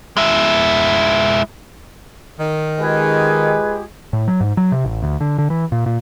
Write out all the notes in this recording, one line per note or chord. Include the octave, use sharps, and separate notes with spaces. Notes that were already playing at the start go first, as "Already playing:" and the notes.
G#3 E4
D#3
G#3 F4 G4 G#4 B4
A2
F#3
G#2
F#3
C3
A1
D2
D3
D3
E3
A#2
A#2